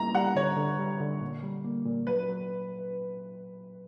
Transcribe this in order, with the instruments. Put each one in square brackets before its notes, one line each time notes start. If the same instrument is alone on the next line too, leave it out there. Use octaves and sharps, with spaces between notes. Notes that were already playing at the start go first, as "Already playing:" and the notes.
Already playing: [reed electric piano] G3 A#3 E4 [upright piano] A#5
[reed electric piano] G3 [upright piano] F#5
[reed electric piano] D3 [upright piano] C#5
[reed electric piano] D3
G3
D3
A#2
G3
A#3
A#2
[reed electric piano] F#3 [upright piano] B4
[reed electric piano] F#3